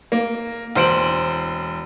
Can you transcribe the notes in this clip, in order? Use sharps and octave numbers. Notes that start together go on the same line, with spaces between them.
A#3
E1 C5 D7 F#7